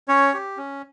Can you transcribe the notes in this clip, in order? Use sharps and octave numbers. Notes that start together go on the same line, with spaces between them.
C#4 C#5
G4
C#4